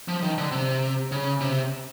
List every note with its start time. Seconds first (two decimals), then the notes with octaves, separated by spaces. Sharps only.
0.08 F3
0.22 D#3
0.38 D3
0.52 C3
1.12 C#3
1.40 C3